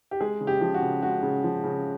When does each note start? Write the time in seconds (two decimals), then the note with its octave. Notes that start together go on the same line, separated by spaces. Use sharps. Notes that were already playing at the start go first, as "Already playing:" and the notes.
0.11 G4
0.21 G#3 G#4
0.41 C#3
0.47 G4
0.61 F3
0.74 F#4
0.82 C#3
1.03 G#3 F#4
1.23 C#3
1.44 F3
1.64 C#3